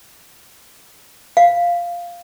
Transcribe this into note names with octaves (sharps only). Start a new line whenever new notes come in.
F5